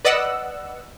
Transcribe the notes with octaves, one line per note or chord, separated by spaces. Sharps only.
B4 D5 D#5 F#5 E6